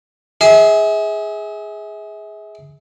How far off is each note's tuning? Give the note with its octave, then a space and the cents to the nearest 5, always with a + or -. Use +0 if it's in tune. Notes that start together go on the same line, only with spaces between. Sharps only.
G#4 +0 E5 -35